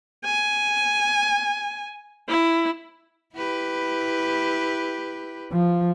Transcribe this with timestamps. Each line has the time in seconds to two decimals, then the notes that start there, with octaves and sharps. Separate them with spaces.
0.25 G#5
2.29 E4
3.34 E4 G4 B4
5.53 F3